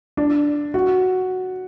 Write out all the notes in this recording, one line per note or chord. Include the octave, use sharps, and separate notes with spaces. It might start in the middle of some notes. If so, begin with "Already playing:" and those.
D4
F#4